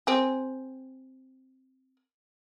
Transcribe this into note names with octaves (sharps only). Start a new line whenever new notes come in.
C4 G#4